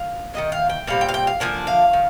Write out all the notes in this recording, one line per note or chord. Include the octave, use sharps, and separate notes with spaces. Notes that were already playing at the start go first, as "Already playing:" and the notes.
Already playing: F5
D#3 G3 A#3 D#5
F5
G5
A#2 G3 C4 F5
G5
F5
G5
F5
D3 F3 A#3 D4 G#5
F5
D#3